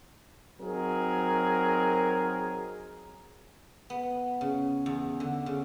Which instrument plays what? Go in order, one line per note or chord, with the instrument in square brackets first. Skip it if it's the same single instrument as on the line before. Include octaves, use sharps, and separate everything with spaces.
[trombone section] F#3 C4 D#4 G#4 A#4
[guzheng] B3
C#3
E2
D3
C#3